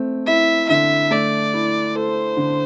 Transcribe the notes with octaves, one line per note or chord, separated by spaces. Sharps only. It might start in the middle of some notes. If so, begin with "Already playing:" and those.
Already playing: A3 C4
E4 E5
D3 E5
A3 D5
E4
A4 C5
D3